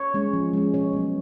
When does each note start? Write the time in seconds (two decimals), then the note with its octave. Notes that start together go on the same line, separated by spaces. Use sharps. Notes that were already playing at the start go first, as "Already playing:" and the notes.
Already playing: C#5
0.14 G#3 C#4
0.34 F3
0.53 G#3 C#4
0.74 B2 C#5
0.93 F#3 B3